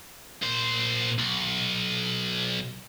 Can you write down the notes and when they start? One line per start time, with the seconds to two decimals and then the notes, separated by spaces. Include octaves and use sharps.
0.42 A#2 C5
1.19 B1